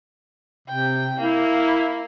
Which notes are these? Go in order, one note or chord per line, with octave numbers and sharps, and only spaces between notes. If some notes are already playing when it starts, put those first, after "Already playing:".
C3 G5
A#3 E4